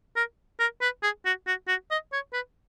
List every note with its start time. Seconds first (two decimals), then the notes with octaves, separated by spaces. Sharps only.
0.16 A#4
0.60 A#4
0.82 B4
1.03 G#4
1.26 F#4
1.47 F#4
1.68 F#4
1.91 D#5
2.12 C#5
2.33 B4